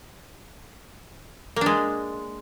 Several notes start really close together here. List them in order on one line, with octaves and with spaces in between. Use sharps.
A#3 D4 G#3